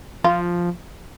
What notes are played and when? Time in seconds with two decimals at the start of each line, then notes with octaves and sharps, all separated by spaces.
0.24 F3 F4